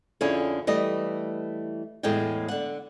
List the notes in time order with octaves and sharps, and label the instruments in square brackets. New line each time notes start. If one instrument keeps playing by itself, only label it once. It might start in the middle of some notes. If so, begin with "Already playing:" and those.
[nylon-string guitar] F2 D3 C#4 E4 G#4
E3 G3 A3 D#5
E2 A2 G#3 A3 G5
D3 F#5